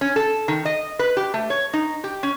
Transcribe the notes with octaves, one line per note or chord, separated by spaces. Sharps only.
C#4
A4
D#3
D#5
B4
G4
A3
C#5
D#4
G4
C#4